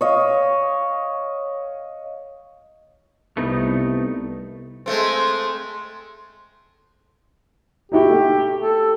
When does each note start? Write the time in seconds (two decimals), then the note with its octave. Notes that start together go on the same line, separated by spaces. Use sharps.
0.01 C#5 D#5 F5
3.37 C2 A3 B3 D#4
4.86 G#3 A3 C4
7.92 D#4 E4 F#4 G4
8.09 A3
8.61 A4